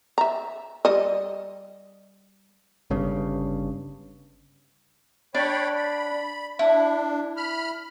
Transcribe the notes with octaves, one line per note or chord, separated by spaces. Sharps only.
E5 A#5
G3 D#5
G1 G2 C#3
D4 C#5 G5 B5
B5
D4 E4
B5 F6